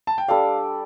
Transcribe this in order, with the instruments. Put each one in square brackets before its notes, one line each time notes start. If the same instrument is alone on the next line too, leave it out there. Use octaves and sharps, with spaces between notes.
[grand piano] A5
G5
[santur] G3 D4 A4 D5 [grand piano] F5